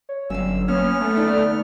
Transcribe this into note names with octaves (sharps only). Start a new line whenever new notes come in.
C#5
G1 F#3 C#4 F5 E6
A#3 B3 C#4 F5 F6
A3
D2 D#4 D5 G5